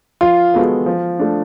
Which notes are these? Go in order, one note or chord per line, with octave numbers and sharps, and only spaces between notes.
F3 F4
G#3 B3 F#4 A4
F3
A3 D4